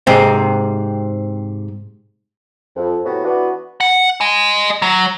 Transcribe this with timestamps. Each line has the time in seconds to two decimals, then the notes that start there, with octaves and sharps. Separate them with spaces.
0.07 G#2 C3 C4
2.76 F2
3.05 A2 C3 F#3 B3
3.25 E3 B3 D4 F#4 B4
3.81 F#5
4.21 D#5 G#5
4.82 F#3